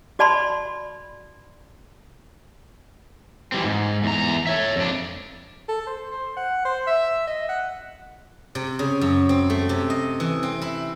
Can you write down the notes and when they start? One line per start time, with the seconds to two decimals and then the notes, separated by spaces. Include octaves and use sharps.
0.19 F#4 D5 A5 B5 C6
3.52 E3 G3 C4
3.64 G#2
4.04 E2 A#5
4.47 C#5 E5
4.76 F2 D4
5.69 A4
5.87 C5
6.11 C5
6.37 F#5
6.65 C5
6.87 E5
7.27 D#5
7.49 F#5
8.55 C3
8.79 C#3
9.01 F#2
9.29 C4
9.50 A3
9.69 C3
9.90 D#5
10.20 E3
10.43 C4
10.62 E4